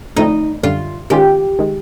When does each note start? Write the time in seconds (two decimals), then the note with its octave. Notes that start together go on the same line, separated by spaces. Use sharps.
0.16 D3 F3 A3 C4 D#4
0.63 F#2 D3 G3 F4
1.10 D#3 G#3 C#4 F4 G4
1.59 D#3 G#3